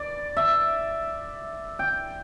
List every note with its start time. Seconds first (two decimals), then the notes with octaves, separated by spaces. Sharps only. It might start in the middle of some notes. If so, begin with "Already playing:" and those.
Already playing: D5
0.37 E5
1.79 G5